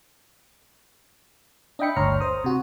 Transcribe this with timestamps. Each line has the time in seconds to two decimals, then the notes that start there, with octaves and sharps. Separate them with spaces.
1.79 D4 D#5 E5 G5 B5 C#7
1.96 G1 D2 C#5 A#5 C6 F6
2.20 C5 D#6
2.44 C3 F#4